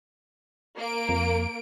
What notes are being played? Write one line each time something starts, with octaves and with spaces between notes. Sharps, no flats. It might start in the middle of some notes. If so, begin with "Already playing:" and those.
A#3 D7
F2